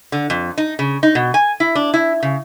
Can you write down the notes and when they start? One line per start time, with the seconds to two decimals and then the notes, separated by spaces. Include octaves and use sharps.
0.12 D3
0.30 F2
0.58 D#4
0.79 C#3
1.03 D#4
1.15 B2
1.34 G#5
1.60 E4
1.75 D4
1.94 E4
2.23 C#3